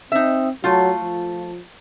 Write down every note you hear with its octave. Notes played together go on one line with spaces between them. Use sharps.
C4 D#4 E5
F#3 A3 F4
F3